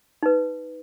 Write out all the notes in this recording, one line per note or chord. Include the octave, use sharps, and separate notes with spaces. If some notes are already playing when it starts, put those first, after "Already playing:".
D#4 B4